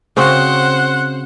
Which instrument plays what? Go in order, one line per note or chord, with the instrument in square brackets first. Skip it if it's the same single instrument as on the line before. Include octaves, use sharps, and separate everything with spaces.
[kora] C#3 C4 F#4 [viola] C5 F#5